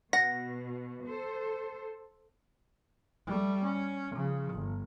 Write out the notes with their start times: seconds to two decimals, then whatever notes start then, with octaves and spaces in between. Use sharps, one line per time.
0.13 B2 F#5 A#6
1.05 A4 C5
3.27 G3 A3
3.63 C#4
4.12 C#3 F3
4.54 G1